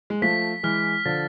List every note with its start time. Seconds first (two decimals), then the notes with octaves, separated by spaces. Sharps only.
0.10 G#3
0.22 F3 A3 B6
0.63 E3 G#3 F6
1.05 D3 F3 A6